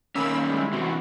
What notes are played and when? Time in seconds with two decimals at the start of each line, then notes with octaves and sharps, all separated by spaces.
0.15 D#3 A#3 C#4 B5 E6
0.49 G3 G#3 E4
0.73 C3 E3 F#4